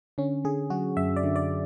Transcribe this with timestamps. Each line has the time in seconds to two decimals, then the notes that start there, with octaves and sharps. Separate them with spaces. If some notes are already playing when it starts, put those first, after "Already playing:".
0.18 D3 C#4
0.44 D3 G#4
0.70 F#3 F#4
0.97 F#2 E5
1.17 D5
1.24 D3
1.36 D5